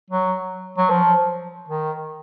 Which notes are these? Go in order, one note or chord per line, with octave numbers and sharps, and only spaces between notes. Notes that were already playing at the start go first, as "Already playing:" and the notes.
F#3
F#3
F3
D#3